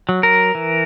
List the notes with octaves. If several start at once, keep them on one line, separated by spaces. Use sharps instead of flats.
F#3
A#4
E3